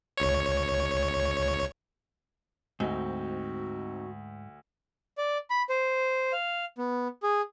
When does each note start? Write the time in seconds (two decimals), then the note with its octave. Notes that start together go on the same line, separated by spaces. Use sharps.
0.17 C#2 C#5
2.80 D2 G#2 C4 D#4 F#4
5.18 D5
5.50 B5
5.69 C5
6.33 F5
6.78 B3
7.23 G#4